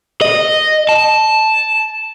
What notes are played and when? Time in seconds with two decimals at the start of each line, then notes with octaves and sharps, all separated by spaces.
0.22 D#5
0.89 A5